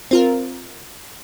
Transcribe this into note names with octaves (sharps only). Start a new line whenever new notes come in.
C4 F4 A#4